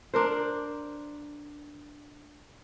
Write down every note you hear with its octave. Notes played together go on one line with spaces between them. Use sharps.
D4 A#4 C5